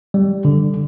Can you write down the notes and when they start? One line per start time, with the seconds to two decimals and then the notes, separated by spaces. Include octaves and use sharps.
0.14 G3
0.45 D3